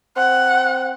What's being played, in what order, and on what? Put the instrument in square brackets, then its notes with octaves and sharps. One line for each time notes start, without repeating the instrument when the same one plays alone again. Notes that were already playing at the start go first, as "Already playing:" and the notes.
[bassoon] C4 [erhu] F#5